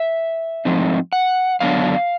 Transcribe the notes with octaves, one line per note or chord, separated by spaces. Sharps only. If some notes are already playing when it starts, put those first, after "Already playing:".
Already playing: E5
G#2 F3 A3 C4 D#4
F#5
F#2 D3 F#3 B3 D4 F5